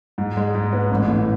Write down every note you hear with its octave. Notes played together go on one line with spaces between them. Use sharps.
G#2
G#3
G#2
B3
A1
A2